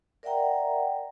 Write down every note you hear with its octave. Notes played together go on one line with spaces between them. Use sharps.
A#4 D5 E5 F#5 G5 A#5